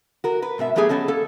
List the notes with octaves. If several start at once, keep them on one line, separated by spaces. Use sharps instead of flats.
F#4 A#4
B4
G#2 B2 A4 E5
F#3 A3 B3 G4 G#4
B3 C#4 A4 D#5
A#3 A4